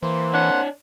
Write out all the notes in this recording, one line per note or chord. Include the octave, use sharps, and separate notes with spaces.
E3 A#3 C5
D4 C#5 F#5